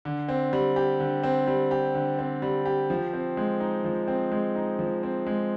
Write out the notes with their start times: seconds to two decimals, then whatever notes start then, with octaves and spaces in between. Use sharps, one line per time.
0.05 D3
0.29 C4
0.53 G3
0.76 G4
1.00 D3
1.23 C4
1.47 G3
1.71 G4
1.95 D3
2.19 C4
2.42 G3
2.66 G4
2.90 F3
3.13 C4
3.37 G#3
3.60 D#4
3.84 F3
4.08 C4
4.32 G#3
4.56 D#4
4.79 F3
5.03 C4
5.26 G#3